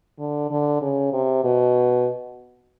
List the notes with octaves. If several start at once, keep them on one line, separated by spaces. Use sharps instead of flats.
D3
D3
C#3
C3
B2